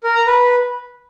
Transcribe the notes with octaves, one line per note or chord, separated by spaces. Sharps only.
A#4
A#5
B4